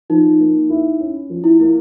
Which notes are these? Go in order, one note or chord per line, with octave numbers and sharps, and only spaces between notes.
F3 D#4
A#3
E4
C#4
F3
E4
A#3 E4